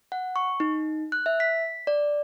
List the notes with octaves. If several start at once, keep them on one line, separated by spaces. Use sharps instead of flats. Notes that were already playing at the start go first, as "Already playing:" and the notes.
F#5
C#6
D#4
F#6
E5
B6
D5